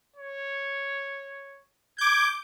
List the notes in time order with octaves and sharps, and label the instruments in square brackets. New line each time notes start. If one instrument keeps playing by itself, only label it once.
[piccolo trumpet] C#5
[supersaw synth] D6 G6 [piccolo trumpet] G#6